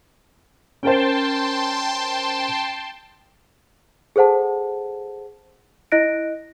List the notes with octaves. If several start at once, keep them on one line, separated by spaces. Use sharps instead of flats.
C#4 A#4 C5 G5 A5 C6
G#4 A4 C5 F#5 A5
E4 D#5 F#6 A#6 D7